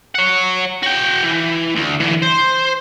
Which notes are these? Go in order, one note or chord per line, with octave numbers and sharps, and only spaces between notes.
C#5 F#5
F#4 G5
E3
D2
D3 E3
C5